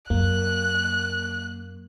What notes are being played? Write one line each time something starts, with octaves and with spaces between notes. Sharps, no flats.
F#2 A#3 F#6